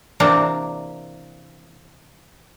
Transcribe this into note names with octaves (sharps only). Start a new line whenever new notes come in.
C3 E3 A#3 C4 D4 E4